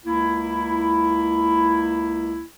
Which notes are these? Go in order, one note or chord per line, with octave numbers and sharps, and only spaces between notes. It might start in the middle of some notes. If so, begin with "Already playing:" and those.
C#2 A#3 E4